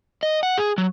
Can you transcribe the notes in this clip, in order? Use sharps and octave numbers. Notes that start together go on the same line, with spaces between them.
D#5
F#5
G#4
F#3